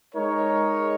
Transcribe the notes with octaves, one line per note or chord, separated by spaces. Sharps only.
G#3 D#4 A#4 C#5